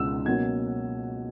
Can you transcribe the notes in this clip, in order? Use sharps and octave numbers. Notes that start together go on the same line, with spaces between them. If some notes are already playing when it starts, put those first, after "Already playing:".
Already playing: C#2 B2 G#3 E6
B2 F#3 A#3 C#4 G#6